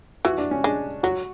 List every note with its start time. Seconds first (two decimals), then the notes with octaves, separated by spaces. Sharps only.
0.25 E3 F#4
0.38 D4
0.51 C#4
0.64 G#3 D4
1.03 F#3 F#4